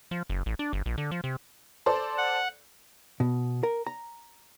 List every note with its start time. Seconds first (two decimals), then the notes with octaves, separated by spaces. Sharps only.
0.11 F3
0.30 F#1
0.46 A1
0.59 D4
0.73 G1
0.86 A#1
0.98 D3
1.11 F3
1.24 C3
1.86 A4 C5 D5
2.18 F#5
3.20 B2
3.63 A#4
3.87 A#5